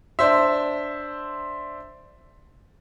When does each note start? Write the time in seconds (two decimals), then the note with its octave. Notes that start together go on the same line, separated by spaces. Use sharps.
0.19 D4 C5 E5